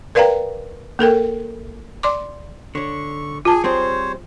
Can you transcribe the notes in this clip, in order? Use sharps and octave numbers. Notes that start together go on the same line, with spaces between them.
A#4 B4 D5 F5 G5 A#5
A#3 A4 A#4 G5
D5 C6 D6
D3 C#5 C#6
F4 G#4 G#5 A5
G3 C4 G#4 C5 C#5